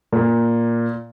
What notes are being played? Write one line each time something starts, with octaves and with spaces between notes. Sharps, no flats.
A#2